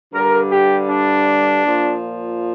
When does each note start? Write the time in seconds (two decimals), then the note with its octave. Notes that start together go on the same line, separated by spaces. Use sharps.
0.13 G2 D3 G3 A#4
0.50 G4
0.89 D4
1.65 A#2 F3